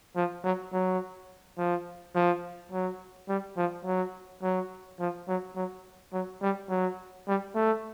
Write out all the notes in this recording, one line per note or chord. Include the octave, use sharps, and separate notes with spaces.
F3
F#3
F#3
F3
F3
F#3
G3
F3
F#3
F#3
F3
F#3
F#3
F#3
G3
F#3
G3
A3